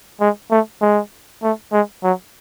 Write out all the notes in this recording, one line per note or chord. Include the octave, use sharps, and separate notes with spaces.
G#3
A3
G#3
A3
G#3
F#3